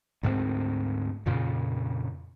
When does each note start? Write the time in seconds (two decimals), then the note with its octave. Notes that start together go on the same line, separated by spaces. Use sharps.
0.23 D2 G#2 A3 C4
1.26 F2 A#2 C#3